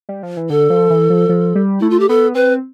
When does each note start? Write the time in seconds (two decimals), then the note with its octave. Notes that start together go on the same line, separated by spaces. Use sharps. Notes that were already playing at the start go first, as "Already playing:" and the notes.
0.09 G3
0.23 F3
0.37 E3
0.50 D3 A4
0.70 F3
0.90 E3
1.10 F3
1.29 F3
1.55 G3
1.80 A3 E4
1.90 F4
2.00 G4
2.09 B3 A4
2.35 C4 B4